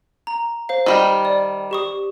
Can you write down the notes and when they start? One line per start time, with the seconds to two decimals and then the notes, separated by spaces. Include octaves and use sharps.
0.27 A#5
0.69 C5 F5
0.86 D#3 G3 G5
1.25 D5
1.71 G4 C#6 D#6